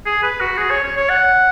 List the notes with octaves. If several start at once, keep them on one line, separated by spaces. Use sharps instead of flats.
G#4
B4
F#4
G#4
C#5
C#5
C#5
F#5